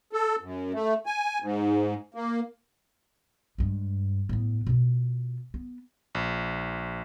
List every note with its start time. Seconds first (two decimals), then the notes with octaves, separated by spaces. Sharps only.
0.13 A4
0.42 F#2
0.74 A3
1.06 G#5
1.42 G#2
2.14 A#3
3.58 G2 G#3
4.29 A2 B3
4.67 B2 F4
5.54 B3
6.15 A#1